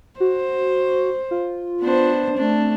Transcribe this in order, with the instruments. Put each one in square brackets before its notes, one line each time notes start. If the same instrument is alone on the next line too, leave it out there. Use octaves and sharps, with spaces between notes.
[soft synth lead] F#4 [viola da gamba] C5
[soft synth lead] F4
[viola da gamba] B3 D4 C5
[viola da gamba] A3 D4 [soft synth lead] C4